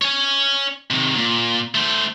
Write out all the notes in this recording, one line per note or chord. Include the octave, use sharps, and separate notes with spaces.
C#5 G#5
C3 D#3
A#2
A3 C5